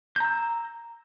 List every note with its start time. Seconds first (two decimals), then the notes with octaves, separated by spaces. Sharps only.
0.16 G6
0.20 A#5
0.25 E6